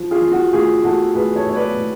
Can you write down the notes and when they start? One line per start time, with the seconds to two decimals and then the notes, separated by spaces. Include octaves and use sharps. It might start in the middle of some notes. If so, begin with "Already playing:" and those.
Already playing: F3
0.11 F4 G#4
0.21 F3
0.31 F#4
0.52 A2 F4 G#4
0.83 A2 F#4 A4
1.14 A2 G#4 B4
1.36 A4 C#5
1.46 A2 C#5
1.56 B4 D5
1.77 A2